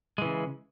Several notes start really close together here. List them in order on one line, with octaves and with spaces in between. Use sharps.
G#3 E3 C#3